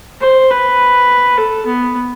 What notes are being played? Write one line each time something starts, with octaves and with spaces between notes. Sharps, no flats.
C5
B4
A4
B3